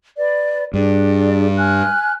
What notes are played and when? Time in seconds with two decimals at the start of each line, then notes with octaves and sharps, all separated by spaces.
0.18 B4 D5
0.74 G2 D4 G#4 D5
1.57 G#5 F6 F#6